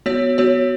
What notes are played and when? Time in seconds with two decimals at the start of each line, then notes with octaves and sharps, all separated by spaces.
0.06 B3 F#4 C#5
0.38 B3 F#4 C#5